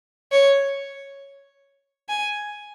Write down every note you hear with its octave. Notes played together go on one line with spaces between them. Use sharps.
C#5
G#5